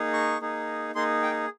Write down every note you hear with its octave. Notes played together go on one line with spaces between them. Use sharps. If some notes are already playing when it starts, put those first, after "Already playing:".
Already playing: A#3 D#4 G#4
C#6
A#3 D#4 G#4
A#3 D#4 G#4 C6
G5